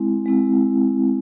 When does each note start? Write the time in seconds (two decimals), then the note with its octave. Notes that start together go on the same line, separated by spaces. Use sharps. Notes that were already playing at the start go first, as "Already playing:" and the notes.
Already playing: G#3 C4 E4
0.26 G#3 C4 E4